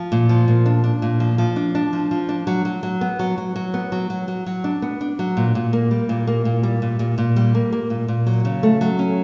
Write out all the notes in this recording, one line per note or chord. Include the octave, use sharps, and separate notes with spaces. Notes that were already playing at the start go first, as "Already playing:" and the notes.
Already playing: F3
A#2
F3
A#2
D4
D4
A#2
F3
F3
D4
D4
F3
F3
D4
F#3
F#3
F#3
B3
F#3
F#3
F#3
B3
F#3
F#3
F#3
F#3
D4
B3
D4
F#3
A#2
A#2
A#3
G3
A#2
A#3
A#2
G3
A#2
A#2
A#2
G3
A#3
A#3
A#2
A#2
F#3
C#3
A3
F#3
C#4